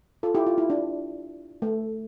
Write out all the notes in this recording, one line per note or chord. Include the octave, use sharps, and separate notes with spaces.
F4 A4
E4 G4
F4
E4
D4
A3